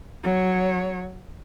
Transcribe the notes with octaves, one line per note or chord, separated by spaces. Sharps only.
F#3 C#5